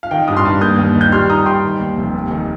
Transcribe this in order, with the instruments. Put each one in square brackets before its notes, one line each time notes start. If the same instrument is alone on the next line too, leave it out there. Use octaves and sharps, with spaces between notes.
[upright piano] F5
[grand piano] D#3 [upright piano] G5
[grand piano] G2 [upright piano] D#6
[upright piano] C6 F6
[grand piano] G2
[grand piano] A#3 [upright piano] D#6 G6
[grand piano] D#2
D#3
[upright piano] G6
[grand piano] G3 [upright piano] C6 F6
[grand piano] D#4 [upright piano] A#5 D#6
[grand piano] G3 [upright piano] G5 C6
[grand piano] D#3
D#2
F1
D#2
D#3